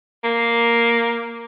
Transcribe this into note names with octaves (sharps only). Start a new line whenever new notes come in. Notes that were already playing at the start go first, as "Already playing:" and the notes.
A#3